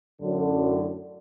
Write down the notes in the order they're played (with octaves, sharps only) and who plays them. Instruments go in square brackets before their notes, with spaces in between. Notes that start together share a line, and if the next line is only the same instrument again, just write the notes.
[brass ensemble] F#2 A2 D3